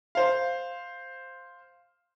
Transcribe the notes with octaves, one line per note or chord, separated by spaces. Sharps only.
C5 F5